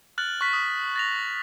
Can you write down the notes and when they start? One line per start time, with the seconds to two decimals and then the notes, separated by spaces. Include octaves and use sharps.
0.18 F6 F#6 A6 F#7
0.41 C#6 F#6 B6
0.53 D#6
0.96 A6 A#6 F7